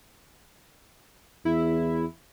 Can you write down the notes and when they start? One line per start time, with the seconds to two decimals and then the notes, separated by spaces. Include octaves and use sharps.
1.45 E2 E4